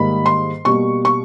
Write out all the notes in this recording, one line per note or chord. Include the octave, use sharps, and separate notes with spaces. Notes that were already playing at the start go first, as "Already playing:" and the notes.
Already playing: G#2 D#3 G3 A#3 B5
C6
B2 G3 A#3 C#6
C#6